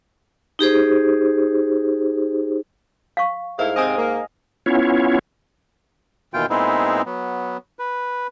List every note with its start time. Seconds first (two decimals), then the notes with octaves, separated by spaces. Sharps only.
0.59 D#4 G4 G#4 C5
3.17 F5 C#6
3.59 G#2 A3 E4 A#4 F5
3.76 C3 C4 D#5 G#5 D#6
3.98 A#3
4.66 B3 C#4 E4 F4 C#5
6.34 D#2 B2 E3 F4 G5
6.50 A#2 G#3 B3 C4 D#4 E4
7.06 F#3 B3
7.79 B4